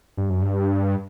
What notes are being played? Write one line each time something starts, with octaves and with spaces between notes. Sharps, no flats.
G2
F#2
G2